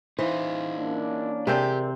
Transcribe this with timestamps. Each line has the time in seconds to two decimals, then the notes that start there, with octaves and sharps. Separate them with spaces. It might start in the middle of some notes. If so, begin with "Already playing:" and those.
0.19 E3 D#4 F4 C5
0.77 A#3 C#4 D4
1.47 C3 C4 G4 G#4 A#4 C5 D5